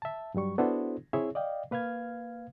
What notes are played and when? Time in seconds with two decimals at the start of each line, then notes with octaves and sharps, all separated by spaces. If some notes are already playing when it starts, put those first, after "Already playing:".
0.02 E5 A5
0.34 G2 F#3 G3 C#6
0.58 B3 D4 E4 F#4 A4 C5
1.13 C4 E4 G#4 C#5 E5
1.35 D5 D#5 F5 G5
1.71 A#3 B4 F5 F6 G#6